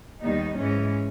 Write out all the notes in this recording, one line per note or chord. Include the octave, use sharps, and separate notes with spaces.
D#2 D#3 G3 B3 D#4
G#2 E3 G#3 C#4